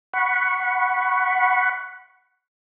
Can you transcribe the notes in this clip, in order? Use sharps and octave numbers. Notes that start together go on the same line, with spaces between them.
F#5 B5 C#6